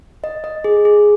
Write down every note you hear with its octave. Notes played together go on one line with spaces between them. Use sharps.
D#5
D#5
G#4
G#4